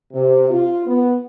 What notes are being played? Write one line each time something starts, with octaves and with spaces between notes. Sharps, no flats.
C3
F4
B3